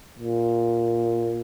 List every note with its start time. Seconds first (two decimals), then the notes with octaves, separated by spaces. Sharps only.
0.19 A#2